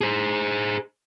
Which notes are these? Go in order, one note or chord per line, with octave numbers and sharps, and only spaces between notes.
G#4 C5